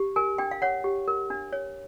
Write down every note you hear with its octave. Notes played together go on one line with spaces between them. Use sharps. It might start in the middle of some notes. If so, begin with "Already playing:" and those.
Already playing: G4
A#4 G#5
D4 G5
F5
C#5 F#5
G4
A#4
D4
C#5